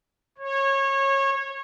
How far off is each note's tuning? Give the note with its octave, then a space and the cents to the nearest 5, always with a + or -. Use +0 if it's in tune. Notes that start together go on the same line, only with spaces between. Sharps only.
C#5 -25